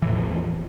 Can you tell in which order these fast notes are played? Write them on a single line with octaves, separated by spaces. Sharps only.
E3 A2 E2 F3